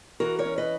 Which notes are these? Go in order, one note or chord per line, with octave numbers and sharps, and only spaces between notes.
E3 F#4 A#4
A#4 C#5
C#4
B4 D#5